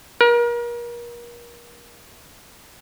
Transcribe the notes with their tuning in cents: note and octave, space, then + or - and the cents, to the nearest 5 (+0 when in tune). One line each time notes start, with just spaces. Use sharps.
A#4 +35